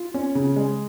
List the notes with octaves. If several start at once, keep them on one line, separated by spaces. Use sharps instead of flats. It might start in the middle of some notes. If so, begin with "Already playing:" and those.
Already playing: F4
C#4
C#3
G#3